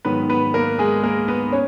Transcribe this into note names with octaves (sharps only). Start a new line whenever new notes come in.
G#2 D#3 F#3 B3 B4
B3 B4
A#3 A#4
G#3 G#4
A#3 A#4
B3 B4
C#4 C#5